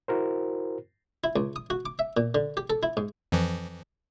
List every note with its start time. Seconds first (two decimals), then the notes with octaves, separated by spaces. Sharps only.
0.08 E4 F#4 A#4 C5
1.24 E4
1.36 C#2
1.56 D#6
1.70 F#4
1.86 D6
1.99 E5
2.17 A#2
2.35 D3
2.57 G4
2.70 A4
2.83 E4
2.97 G#2
3.32 F2 E3 F3